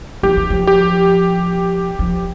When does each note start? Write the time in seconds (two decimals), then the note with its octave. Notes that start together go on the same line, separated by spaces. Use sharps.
0.23 F3 G4
0.37 E3
0.50 F3
0.67 G4
1.99 F3